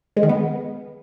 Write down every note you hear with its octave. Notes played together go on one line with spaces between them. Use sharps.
G#3
D#3
B3